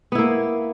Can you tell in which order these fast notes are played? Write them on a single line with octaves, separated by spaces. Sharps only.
B3 E4 A#3